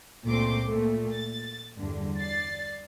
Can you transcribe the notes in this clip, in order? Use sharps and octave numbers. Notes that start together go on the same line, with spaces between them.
C#2 A#2 A3 C4 C6 D6
A#2 A3
A6
E2 G2 D3
D5 A6 C7